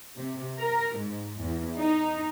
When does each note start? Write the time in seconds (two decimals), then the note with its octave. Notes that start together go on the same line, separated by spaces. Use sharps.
0.16 C3
0.59 A#4
0.98 G#2
1.40 E2
1.78 D#4